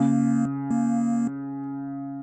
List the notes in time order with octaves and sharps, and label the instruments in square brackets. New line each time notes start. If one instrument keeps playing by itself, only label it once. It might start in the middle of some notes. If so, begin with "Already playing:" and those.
Already playing: [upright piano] C#3 [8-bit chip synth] A#3
[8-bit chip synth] A#3